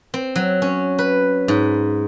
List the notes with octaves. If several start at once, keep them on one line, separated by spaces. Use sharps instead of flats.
C4
F#3
C#4
B4
G#2